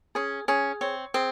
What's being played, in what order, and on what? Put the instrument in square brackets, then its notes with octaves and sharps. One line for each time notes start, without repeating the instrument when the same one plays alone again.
[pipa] C#4 [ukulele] G#4
[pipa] C#4 [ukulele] G#4
[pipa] C4 [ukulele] C#5
[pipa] C4 [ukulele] G#4